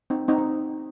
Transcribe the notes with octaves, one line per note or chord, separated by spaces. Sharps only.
C4 D#4
C4 D#4
C4